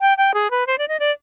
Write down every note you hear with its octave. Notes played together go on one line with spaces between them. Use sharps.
G5
G5
G#4
B4
C5
D5
D#5
D5